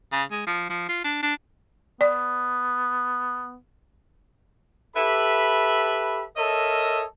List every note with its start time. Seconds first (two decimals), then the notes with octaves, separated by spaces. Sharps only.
0.12 C#3
0.31 G#3
0.46 F3
0.70 F3
0.89 F4
1.04 D4
1.22 D4
2.01 B3 D5
4.96 G4 A4 B4 E5 B5
6.37 A4 A#4 C#5 D#5 E5